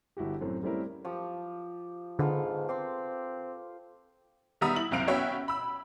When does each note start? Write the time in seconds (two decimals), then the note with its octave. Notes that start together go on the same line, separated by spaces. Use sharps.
0.17 G1 E4 F#4 G4
0.41 F#2 A2 A3 C4
0.63 G3 A3 C4 C#4 E4 A#4
1.05 F3 G4 C#6
2.19 G#2 D3 B3 F4 A4
2.68 C4 G5 C6 D6
4.61 D#3 G3 B3 E5 A#5 D#6
4.76 E4 F#7
4.91 F#1 C2 C4 F5 D7 F7
5.07 B3 C#4 F#4 C#5 E5 G5
5.48 B5 E6